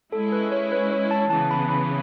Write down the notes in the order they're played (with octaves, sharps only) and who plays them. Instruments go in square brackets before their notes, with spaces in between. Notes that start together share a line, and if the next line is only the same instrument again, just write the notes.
[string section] G#3 C#4 E4 [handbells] A4
[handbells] B4
C#5
B4
C#5
A5
[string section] C#3 E3 B3 [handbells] A5
[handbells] B5
B5